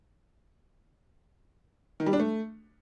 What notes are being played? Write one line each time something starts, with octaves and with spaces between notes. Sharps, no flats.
D#3
G3
D4
A3